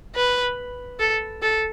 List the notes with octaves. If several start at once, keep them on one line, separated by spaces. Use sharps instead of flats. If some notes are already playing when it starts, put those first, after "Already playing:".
B4
A4
A4